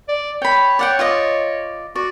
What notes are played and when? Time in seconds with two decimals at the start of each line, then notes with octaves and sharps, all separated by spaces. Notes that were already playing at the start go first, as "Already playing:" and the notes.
0.08 D5
0.42 C#5 G5 B5
0.79 D5 F#5 G5
0.99 F4 D5 D#5
1.95 F#4 D5